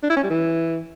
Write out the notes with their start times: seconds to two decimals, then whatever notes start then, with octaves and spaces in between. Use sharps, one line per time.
0.03 D4
0.10 E4
0.16 C#4
0.23 G3
0.30 E3